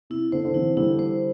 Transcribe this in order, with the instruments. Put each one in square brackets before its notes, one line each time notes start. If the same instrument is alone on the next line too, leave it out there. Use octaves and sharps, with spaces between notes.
[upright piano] C3 [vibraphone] E4
[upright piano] D3 [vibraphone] C5
[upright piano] D3
[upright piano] C3 E3 [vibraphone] E4
[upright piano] D3 G3 [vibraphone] E4
[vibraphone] C5